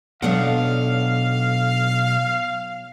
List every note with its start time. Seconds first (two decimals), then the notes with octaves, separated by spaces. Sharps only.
0.22 B1 F#3 B3 D4 D#4 A4 F5 F#5